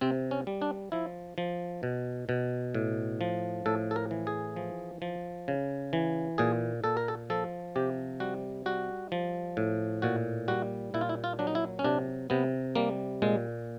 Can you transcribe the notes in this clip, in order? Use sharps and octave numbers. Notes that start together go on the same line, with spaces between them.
C3 C4
C#4
G3
D4
F3 E4
F3
B2
B2
A2
F3
A2 A4
A4
A#4
E3
G#4
F3
F3
C#3
E3
A#2 G#4
A#2 A4
A#4
A4
F3 A4
C3 G4
G3 F#4
G3 F#4
F3
A2
A#2 F#4
G3 F#4
A#2 E4
F4
E4
F4
F#3 D4
D#4
E4
C#4
C3 D4
C3 B3
G3 A#3
A#2 G#3